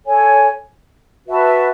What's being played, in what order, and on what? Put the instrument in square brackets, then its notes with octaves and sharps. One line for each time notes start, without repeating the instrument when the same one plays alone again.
[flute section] A4 C#5 G#5
F#4 B4 E5 A5